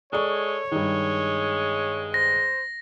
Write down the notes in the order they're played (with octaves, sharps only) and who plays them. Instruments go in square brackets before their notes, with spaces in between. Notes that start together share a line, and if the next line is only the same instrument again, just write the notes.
[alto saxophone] G#3 [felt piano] A4 D5 C#6 [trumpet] C#5
[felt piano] G2 D#3 [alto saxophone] G#3
[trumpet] C5 [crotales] A#6